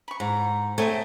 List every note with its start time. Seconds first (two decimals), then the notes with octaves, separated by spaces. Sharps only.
0.08 B5 C#6
0.20 G#2 A#5
0.78 A3 C4 C#5 D#5 G5